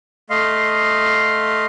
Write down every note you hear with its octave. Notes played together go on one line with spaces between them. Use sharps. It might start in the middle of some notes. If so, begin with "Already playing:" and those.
A3 D#5 F5 C6